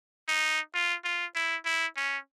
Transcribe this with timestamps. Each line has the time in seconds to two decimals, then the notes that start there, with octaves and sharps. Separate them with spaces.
0.28 D#4
0.74 F4
1.04 F4
1.35 E4
1.65 E4
1.96 C#4